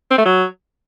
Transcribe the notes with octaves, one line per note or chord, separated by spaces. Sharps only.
C4
A3
F#3